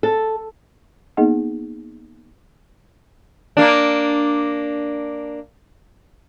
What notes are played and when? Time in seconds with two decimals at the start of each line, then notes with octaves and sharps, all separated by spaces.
0.03 A4
1.17 A#3 B3 D#4 G#4 D#5 F#5
3.57 A#3 D4